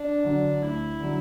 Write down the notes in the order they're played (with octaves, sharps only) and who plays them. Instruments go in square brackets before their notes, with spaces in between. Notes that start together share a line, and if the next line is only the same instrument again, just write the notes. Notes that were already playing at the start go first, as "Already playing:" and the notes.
Already playing: [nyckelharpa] D4
[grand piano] D3 F#3
[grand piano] D2 [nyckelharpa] E4
[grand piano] D3 F#3